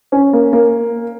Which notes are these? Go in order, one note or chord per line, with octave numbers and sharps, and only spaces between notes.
C#4
A#3
A#3